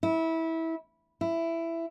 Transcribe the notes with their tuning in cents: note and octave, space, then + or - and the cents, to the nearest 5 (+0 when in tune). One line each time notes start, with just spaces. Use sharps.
E4 -20
E4 +10